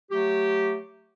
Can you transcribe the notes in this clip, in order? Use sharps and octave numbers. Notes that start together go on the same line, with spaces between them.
F#3 A3 G4